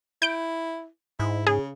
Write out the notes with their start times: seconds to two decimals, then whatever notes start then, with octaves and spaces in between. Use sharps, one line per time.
0.22 E4 G6 D7
1.19 G#2 E4
1.47 C#3 G#4